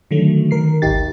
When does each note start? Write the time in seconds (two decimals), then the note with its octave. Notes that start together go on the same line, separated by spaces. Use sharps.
0.11 D3 D#3 F#3 A3
0.51 D#3 A#4 C7
0.82 G#1 D2 D#4 G4 A6